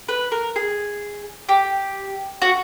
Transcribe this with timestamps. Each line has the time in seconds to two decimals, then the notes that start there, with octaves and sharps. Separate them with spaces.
0.09 B4
0.32 A#4
0.56 G#4
1.49 G4
2.42 F#4